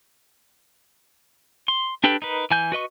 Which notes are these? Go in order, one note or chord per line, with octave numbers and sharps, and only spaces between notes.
C6
D4 G4 A4 B4 G5
D#4 A#4 B4
E3 G#5 G6
F#4 B4 D#5 C#6